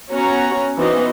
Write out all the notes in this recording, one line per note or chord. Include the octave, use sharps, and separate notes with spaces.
B3 C#4 F#4 C#5 F#5 A#5
E3 B3 C4 D#4 F#4 D#5